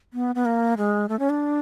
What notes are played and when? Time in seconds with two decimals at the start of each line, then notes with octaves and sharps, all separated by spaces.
0.14 B3
0.35 B3
0.45 A#3
0.78 G#3
1.09 A3
1.19 C#4
1.30 D4